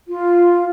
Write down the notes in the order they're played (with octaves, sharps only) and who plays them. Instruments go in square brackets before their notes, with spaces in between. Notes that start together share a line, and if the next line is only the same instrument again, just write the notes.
[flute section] F4